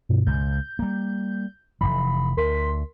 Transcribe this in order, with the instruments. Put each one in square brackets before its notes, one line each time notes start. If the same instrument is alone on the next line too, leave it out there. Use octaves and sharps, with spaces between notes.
[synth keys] G2 B2
[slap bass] C#2 [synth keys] G6
[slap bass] G3 A#3
[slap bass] F1 C2 E3 [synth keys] B5
[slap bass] D2 [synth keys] A#4 C6 B6